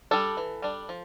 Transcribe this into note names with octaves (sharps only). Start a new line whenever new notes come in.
G3 D4 A4
E3
G3 D4
F3